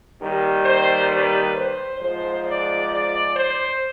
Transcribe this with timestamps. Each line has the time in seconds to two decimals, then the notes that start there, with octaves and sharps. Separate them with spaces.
0.21 D#2 D#3 G3
0.66 C5
1.11 B4
1.55 C5
2.00 G#2 F3 G#3 C5
2.46 D5
2.90 D5
3.35 C5